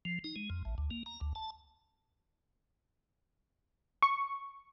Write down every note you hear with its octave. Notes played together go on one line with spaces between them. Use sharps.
F3
D#4
G#3
F2
A1
D2
A#3
A#5
D2
A5
C#6